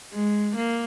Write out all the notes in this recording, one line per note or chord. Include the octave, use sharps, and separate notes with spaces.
G#3
A#3